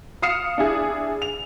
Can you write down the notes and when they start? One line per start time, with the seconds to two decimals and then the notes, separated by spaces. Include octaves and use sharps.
0.22 F5 D#6 F6 C7 C#7 E7
0.58 D4 E4 G#4
1.22 F7